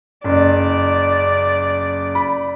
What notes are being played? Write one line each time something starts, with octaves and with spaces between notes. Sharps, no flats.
F#1 D5
B5